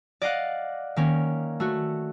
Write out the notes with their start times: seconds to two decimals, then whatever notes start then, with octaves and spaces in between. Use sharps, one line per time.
0.22 D5 D#5 F5 F#5
0.96 D#3 A#3 C#4
1.60 A3 F#4